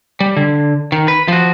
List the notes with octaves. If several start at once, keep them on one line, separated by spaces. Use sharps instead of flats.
G3
D3
D#3
B4
F3 F#4